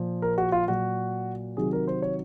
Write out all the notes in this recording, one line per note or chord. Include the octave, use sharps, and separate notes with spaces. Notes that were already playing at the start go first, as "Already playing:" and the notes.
Already playing: A#2 F3
A#4
F#4
F4
A#2 F#3 F#4
C3 D#3 F#3 G#4
A#4
C5
C#5